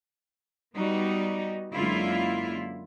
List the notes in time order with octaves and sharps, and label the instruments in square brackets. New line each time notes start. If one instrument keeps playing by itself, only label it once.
[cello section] G3 B3 D#4 F#4
F#2 D3 G#3 A#3 E4 F4